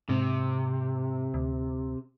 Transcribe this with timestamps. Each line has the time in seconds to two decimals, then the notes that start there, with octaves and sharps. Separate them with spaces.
0.09 G#2 C3
1.34 D2